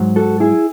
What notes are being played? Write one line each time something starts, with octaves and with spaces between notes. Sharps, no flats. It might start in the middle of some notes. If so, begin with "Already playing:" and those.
Already playing: G#2 F#3
F#4 A4
E4 G#4